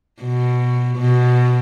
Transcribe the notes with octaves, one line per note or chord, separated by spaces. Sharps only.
B2
B2